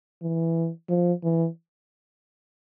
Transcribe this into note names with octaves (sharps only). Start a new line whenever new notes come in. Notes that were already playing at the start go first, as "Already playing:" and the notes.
E3
F3
E3